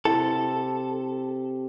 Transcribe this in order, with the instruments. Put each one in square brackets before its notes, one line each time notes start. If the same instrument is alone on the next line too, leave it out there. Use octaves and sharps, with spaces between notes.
[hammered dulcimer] C3 [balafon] E4 [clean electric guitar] A4